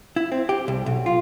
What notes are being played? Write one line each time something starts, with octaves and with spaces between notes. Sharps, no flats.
E4
C4
G4
C2
B1
F4